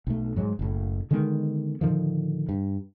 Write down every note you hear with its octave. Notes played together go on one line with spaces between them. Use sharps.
B1 A3
G#2 F#3 G#3
F#1 A2
D3 D#3 G#3 B3
A2 D3 D#3 F3
G2